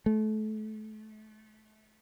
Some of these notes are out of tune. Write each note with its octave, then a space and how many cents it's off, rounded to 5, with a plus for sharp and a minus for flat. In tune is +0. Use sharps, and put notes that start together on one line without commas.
A3 -30